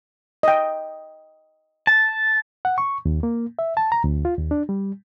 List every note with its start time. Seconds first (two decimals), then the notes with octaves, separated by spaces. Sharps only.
0.43 D#5 G5
1.87 A5
2.65 F#5
2.78 C#6
3.05 D#2
3.23 A#3
3.59 E5
3.77 A5
3.92 A#5
4.04 D2
4.25 F4
4.38 D#2
4.51 D4
4.69 G3